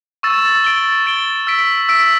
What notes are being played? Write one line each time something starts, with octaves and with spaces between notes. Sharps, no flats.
C#6 E6 A6 E7
A6 D7 G7
A6 D7 G7
E6 B6 D7
E6 B6 D7